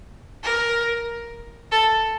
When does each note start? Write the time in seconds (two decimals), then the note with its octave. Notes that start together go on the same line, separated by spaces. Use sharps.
0.43 A#4
1.72 A4